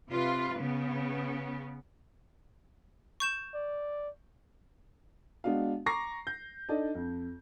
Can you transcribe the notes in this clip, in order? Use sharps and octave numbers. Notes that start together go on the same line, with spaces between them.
C3 F4 B4
C#3 B3
C#6 G6 E7
D5
G#3 B3 D4 F#4 F5
A#5 C#6 D6 A#6 C7
G6
D4 D#4 A4 D5 D#5
F2